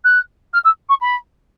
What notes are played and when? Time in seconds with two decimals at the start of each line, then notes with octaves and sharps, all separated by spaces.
0.04 F#6
0.53 F6
0.64 E6
0.89 C#6
1.01 B5